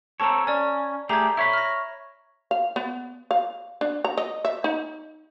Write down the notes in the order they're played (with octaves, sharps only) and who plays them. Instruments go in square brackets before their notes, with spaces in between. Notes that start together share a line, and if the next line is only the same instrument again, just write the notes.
[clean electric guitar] C4 A4 C#5 [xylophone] A5 A#5
[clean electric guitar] C#4 [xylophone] D5 G#5
[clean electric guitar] A3 G4 G#4 [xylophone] A#5 G#6
[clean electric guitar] E4 C#5 B5 [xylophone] E5
[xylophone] F6 A#6
[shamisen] F5
B3
F5
D4
A#5
D#5
E5
D#4